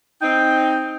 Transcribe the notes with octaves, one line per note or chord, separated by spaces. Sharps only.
C4 D#4 G5